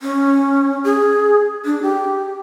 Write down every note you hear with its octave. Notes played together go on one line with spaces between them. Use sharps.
C#4
G#4
D4
G4